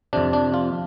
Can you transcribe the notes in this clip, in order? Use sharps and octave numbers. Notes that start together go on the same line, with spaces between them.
F2 C3 D4
D4
F4